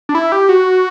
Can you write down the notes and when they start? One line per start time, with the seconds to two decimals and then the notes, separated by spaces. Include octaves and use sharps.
0.09 D4
0.15 E4
0.32 G4
0.49 F#4